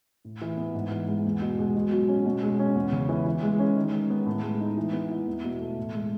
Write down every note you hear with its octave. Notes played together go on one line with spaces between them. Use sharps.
A2
E3
B3
G#2
E3
G#3
E2
B2
G#3
B2
F#3
C#4
B2
G#3
C#4
E2
C#3
E3
E3
G#3
C#4
D#3
G#3
B3
A2
G#3
D#4
E3
B3
E4
E2
B2
A3
A2
G#3